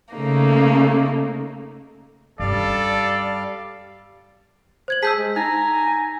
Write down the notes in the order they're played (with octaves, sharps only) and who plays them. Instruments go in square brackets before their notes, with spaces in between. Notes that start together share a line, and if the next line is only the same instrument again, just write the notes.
[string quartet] C#3 A3 A#3 D#4
[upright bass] G2 C#4 [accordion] G3 F5 [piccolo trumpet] A4 [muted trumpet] D5
[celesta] C5 G#6 F#7
[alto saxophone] G#4 [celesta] A5 [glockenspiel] E6 G6 B6
[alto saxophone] G#3
[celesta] D#4 [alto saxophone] G#5 [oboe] A#5